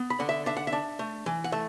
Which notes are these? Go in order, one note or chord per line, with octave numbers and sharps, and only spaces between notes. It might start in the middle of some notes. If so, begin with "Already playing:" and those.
Already playing: B3
B5
D3 F#5
E5
D4 E5
F#5
E5
D4
A3
E3
F#5
A3 E5